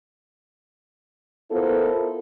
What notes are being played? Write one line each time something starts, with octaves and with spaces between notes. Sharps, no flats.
B3 E4 F4 A4 A#4 C5